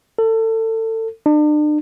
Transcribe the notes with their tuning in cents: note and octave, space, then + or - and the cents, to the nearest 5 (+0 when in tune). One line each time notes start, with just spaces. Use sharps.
A4 +30
D4 +40